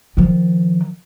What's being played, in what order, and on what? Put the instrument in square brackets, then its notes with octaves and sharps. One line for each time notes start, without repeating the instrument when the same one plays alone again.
[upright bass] D#3 F3